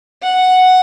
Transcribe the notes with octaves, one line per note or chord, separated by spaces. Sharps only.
F#5